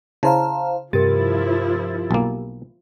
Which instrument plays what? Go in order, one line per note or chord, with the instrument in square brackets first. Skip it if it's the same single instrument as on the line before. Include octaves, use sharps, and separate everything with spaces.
[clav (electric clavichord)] C#3 [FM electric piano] E4 C5 F5 [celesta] A5 A#5
[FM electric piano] G2 C3 A6 [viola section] F3 E4 [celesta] G4 A#4
[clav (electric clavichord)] B1 A#3